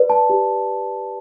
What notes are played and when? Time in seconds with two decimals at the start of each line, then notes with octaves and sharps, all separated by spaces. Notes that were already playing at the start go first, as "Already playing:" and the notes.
Already playing: B4 D5
0.10 A5
0.30 G4